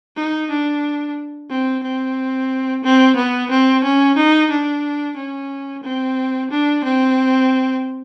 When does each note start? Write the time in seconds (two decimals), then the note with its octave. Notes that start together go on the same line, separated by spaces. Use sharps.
0.16 D#4
0.50 D4
1.50 C4
1.83 C4
2.84 C4
3.16 B3
3.51 C4
3.84 C#4
4.17 D#4
4.51 D4
5.16 C#4
5.83 C4
6.51 D4
6.84 C4